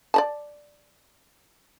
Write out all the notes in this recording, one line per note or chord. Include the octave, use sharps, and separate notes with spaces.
D5 D#5 A5